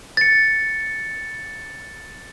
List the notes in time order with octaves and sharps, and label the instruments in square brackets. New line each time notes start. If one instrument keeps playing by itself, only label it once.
[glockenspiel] A6 C#7